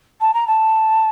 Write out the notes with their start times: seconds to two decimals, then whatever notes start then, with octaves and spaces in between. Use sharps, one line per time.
0.20 A5
0.33 A#5
0.47 A5